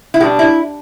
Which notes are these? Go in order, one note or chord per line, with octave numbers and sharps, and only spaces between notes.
E4
B2 G3 D4 G4
E4